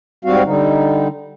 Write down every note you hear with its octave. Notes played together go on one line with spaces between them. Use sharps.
G#2 G3 C4 F#4 F5
D3 G3 D#4